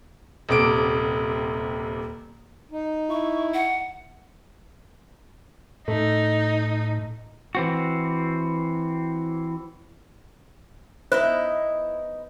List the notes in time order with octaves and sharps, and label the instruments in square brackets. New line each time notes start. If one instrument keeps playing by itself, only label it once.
[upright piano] D#1 C3 D6 D7
[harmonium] D#4
[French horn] E4 [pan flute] C#6
[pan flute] F#5
[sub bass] A2 [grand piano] A3 [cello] D#4
[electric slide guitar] E3 C4 F#4
[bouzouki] B3 D#4 D#5 [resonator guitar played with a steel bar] E4 [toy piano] C5